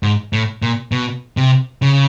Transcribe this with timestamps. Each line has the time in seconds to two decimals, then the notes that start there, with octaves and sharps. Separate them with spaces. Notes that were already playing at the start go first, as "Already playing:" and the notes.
0.03 G#2
0.33 A2
0.62 A#2
0.92 B2
1.37 C3
1.82 C#3